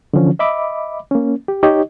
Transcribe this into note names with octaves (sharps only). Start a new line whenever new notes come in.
D3 E3 F3 C#4
D#5 E5 B5 D6
A#3 C#4
G4
D#4 G4 C#5 D#5